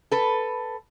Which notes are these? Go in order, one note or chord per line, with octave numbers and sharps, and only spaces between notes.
A4 B4